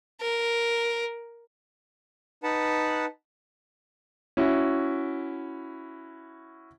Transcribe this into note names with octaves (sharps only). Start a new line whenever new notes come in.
A#4
D#4 B4 F#5 A5
C#4 E4 F#4